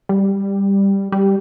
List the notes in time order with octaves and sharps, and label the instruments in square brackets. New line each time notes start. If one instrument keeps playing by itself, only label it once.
[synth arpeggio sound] G3
G3